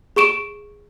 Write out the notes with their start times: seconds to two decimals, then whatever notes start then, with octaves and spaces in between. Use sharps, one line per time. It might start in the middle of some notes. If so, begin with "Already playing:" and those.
0.16 G#4 C#6 D7 E7